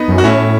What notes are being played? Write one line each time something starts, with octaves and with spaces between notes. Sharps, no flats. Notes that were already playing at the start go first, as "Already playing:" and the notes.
Already playing: B3 D#4
F#2
F#4
A2 C#4 E4